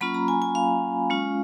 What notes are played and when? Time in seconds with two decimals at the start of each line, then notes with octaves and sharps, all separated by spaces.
0.01 F#3 A#3 C#4 F4 B5
0.14 A#5
0.28 G#5
0.42 G#5
0.55 F5
1.10 G#3 C#4 F4